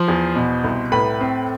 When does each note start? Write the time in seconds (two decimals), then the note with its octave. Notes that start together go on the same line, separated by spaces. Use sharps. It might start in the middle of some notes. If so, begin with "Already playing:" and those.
Already playing: F3 C5 C6
0.08 E2
0.36 B2
0.64 C2
0.92 A2 B4 B5
1.20 C4